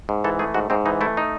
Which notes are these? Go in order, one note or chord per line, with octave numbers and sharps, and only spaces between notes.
G#2
E3 A4
A3 G#4
G#2 F#4
G#2 C4
E3 D#4
A3 E4
D#4